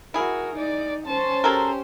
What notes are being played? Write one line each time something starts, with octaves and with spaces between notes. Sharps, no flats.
E4 F#4 G#4 A#4
D#4 D5
C#4 C5 A5
F#3 G4 A4 A#4